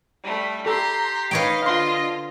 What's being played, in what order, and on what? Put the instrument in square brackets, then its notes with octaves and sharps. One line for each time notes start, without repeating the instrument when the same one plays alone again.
[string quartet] G3 A3
[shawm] G4 [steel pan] A4 [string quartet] A#5 C6
[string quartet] D#4 F5 [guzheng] B4 C#5 G5 [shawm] D#5
[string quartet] D3 F4 [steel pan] F5 C6